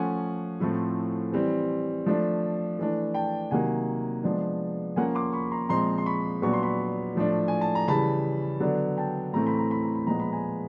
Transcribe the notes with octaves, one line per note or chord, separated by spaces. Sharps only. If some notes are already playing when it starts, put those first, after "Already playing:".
Already playing: F3 A3 C#4 F#5 G#5
A2 F3 A3 C4
E3 G3 C4
F3 A3 D4
E3 A3 D4
G5 A5
C3 D#3 F#3 A#3 F#5 G#5
F3 G#3 B3 D4
F3 A#3 C#4 F#5 G#5
C6 D6
B5 C#6
A#5 C6
A#2 F3 G#3 C4 A#5 C6
C6
B5 C#6
A#2 F#3 B3 D4 C#6
C6
B5 C#6
A2 F3 A3 D4
G#5
A5
A#5
C#3 E3 G3 A5 B5
D3 F#3 B3 D4
G5 A5
A2 E3 A3 C4 A#5
B5
A#5
B5
A#5
B5
A#2 F3 G#3 B3 A#5
B5
G#5 A#5